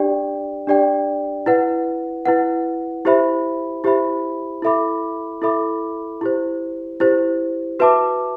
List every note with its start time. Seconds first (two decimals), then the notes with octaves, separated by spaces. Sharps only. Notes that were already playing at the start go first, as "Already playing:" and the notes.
Already playing: D4 G4 D5 G5
0.67 D4 G4 D5 G5
1.46 E4 B4 F#5
2.26 E4 B4 F#5
3.05 E4 G4 C5 E5 B5
3.84 E4 G4 C5 E5 B5
4.62 E4 A4 E5 B5 D6
5.42 E4 A4 E5 B5 D6
6.21 E4 G4 C5
7.00 E4 G4 C5
7.79 F#4 B4 E5 A5 D6